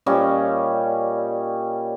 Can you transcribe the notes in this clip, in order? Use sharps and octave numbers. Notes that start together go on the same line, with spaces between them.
A#2 G3 C#4 D#5